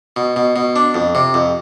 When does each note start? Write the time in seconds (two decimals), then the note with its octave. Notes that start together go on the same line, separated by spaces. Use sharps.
0.16 B2
0.36 B2
0.56 B2
0.76 D4
0.95 F2
1.15 C3
1.34 F2